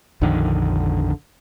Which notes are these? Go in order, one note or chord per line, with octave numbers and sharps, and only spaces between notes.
A#1 F2 D3 D#3